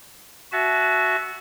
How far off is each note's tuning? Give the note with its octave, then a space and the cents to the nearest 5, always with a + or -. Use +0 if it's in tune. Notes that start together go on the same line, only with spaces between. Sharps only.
F#4 +0 E5 +0 A5 -40